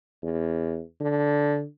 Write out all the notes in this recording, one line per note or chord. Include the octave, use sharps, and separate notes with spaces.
E2
D3